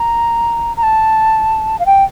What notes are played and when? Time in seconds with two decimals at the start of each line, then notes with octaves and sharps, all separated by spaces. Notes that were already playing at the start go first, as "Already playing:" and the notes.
Already playing: A#5
0.77 A#5
0.83 A5
1.79 F5
1.86 G5